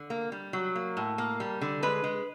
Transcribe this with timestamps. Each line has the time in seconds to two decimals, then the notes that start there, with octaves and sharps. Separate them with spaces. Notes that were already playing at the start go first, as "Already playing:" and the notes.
Already playing: D3
0.10 A#3
0.32 G3
0.53 F#3
0.76 A#3
0.97 A2
1.18 A#3
1.40 G3
1.61 D3
1.83 G#3 B4
2.04 G#3